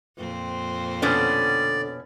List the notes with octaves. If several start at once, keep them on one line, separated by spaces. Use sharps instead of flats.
F2 A#2 C4
B2 D3 B3 C#4 D5